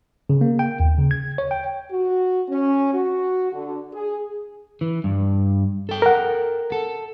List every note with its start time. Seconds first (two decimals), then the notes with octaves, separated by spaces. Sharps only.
0.30 C#3
0.41 A#3
0.59 G5
0.80 D#2
0.98 C#3
1.11 G#6
1.38 C#5
1.51 G5
1.92 F#4
2.49 C#4
2.93 F#4
3.53 D3
3.93 G#4
4.81 E3
5.04 G2
5.89 A4 G5
6.02 A#4 F#5
6.72 A4